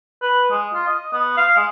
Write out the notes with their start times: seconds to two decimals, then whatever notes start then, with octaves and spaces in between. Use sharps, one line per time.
0.22 B4
0.51 G#3
0.74 F4
0.87 D#5
1.13 B3
1.37 F5
1.56 G#3